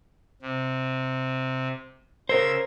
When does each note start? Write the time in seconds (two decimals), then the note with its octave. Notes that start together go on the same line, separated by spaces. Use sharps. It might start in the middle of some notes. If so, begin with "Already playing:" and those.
0.42 C3
2.29 C#3 A#4 C5 E6 G#6